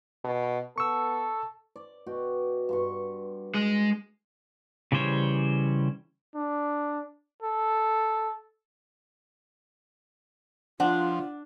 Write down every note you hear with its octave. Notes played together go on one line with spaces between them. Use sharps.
B2
B3 A4 C#6 E6
D5
B2 F#4 G5
G2 C6 C#6
G#3
C#3 E3 G3 C5 C#5
D4
A4
F3 D4 F4 F#5